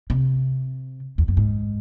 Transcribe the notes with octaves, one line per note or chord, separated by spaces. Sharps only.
C3
E2
F#2
G#2